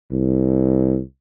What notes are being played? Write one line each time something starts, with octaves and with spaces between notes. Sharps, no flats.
C2